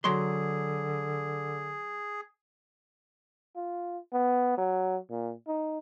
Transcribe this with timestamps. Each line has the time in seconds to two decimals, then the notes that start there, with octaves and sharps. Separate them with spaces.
0.04 D3 F#3 G#4 C6
3.56 F4
4.13 B3
4.58 F#3
5.10 A#2
5.47 D#4